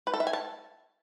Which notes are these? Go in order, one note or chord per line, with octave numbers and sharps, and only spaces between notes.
B4
A4
E5
G#5
A5